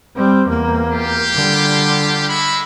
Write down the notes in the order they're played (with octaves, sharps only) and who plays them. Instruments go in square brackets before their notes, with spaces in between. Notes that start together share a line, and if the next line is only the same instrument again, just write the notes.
[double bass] G3 C4
E2 A#3
[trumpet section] F4 G4
[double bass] D3 G3
[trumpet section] G#3 E5 B5